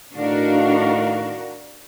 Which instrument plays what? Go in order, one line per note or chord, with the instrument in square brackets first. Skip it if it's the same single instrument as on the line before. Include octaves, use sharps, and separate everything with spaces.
[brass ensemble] A2 D#3 F5 [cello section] D4 F#4 A#4